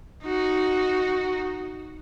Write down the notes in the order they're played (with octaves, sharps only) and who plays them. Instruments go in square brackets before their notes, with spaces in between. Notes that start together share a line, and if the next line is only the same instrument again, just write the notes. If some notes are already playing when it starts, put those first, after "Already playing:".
[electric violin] D#4 F#4